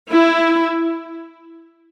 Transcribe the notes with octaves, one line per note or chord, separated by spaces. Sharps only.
E4